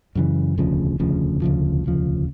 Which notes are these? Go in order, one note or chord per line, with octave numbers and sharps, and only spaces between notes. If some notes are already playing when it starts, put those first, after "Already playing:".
F#2 C#3 E3
E1 D2 C#3 F3
E1 D2 C#3 F3
E1 D2 C#3 F3
E1 D2 C#3 F3